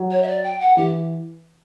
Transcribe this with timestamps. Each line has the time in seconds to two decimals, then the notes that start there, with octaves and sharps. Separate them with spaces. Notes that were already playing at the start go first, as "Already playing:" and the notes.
Already playing: F#3
0.10 C#5
0.22 E5
0.27 D5
0.43 G5
0.60 F#5
0.76 E3 G4